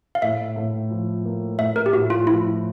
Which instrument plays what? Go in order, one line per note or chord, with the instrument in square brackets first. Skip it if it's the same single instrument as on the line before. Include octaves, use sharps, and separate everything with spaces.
[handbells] F5
[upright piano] A2 [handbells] E5
[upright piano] A2
F3
A#3
[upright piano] A2 [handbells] E5
[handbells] A#4
G4
[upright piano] A2 [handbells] F#4
[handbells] F4
[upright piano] F3 [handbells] E4